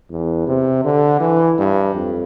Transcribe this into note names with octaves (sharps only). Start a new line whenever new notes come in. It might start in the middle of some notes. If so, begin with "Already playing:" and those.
E2
C3
D3
E3
G2
F2